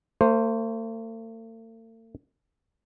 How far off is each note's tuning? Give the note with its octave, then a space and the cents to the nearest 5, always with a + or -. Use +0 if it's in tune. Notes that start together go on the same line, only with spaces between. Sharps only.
A3 +45 C5 +0